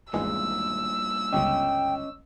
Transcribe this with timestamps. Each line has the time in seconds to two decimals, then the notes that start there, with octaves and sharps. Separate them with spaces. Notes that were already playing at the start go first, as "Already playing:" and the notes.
0.13 G#1 E2 G2 A#2 G#3 E6
1.32 G1 C#2 C#4 D#5 G5